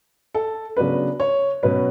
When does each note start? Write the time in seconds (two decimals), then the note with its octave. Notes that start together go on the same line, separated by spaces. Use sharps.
0.34 A4
0.77 C#3 F#3 B3 D4 B4
1.20 C#5
1.63 B2 F#3 C#4 B4